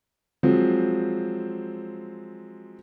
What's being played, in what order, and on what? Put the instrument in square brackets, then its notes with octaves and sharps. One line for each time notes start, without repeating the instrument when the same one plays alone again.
[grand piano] F3 F#3 G#3 C4